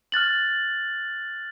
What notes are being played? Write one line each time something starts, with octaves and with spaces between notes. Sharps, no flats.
F6 F#6 A6 F#7